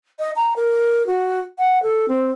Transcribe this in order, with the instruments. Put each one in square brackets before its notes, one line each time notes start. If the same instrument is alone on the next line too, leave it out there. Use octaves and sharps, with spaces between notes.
[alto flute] D#5
A#5
A#4
F#4
F#5
A4
C4